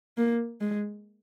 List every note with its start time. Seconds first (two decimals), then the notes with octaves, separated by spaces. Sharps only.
0.18 A#3
0.61 G#3